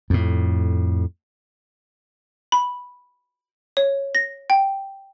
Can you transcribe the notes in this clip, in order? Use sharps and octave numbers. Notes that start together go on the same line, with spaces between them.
F2 A2
B5
C#5
A#6
G5